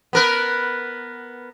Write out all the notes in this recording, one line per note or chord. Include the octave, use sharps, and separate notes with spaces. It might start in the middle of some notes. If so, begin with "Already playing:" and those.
B3 A#4 B4